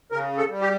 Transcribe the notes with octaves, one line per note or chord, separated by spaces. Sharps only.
C#3 A#4
A4
G3
G4